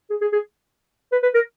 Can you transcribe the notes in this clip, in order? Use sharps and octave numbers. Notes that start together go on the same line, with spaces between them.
G#4
G#4
G#4
B4
B4
A#4